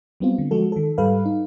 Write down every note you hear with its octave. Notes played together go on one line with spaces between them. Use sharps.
F#3 G3 B3 C4 F4
D3
F3 G#3 F#4 A4
D#3 A4
G#2 G3 A4 B4 F5
D#4